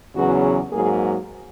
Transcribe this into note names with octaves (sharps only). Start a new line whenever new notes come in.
E2 C#3 F#3 B3 F#4
G#2 F#3 A#3 G#4